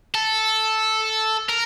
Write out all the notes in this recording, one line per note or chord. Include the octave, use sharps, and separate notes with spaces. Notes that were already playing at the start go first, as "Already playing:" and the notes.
A4
A#4